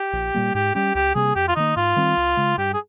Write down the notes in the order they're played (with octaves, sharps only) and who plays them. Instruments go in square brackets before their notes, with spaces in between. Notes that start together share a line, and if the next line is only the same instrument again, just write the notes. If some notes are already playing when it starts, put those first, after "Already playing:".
Already playing: [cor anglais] G4
[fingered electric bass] A#1
A#2 G3 A#3
[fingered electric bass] G#2 [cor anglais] G4
[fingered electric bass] G3 C#4 [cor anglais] G4
[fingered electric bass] C#2 [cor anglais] G4
[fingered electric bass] C3 G3 A#3 [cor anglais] G#4
[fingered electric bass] F2 [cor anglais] G4
[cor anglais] F4
[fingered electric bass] D#3 A#3 [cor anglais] D#4
[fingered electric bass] G#2 [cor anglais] F4
[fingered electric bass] D#3 G3 C4
C#2
C#3 G#3
[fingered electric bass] G2 [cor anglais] G4
[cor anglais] G#4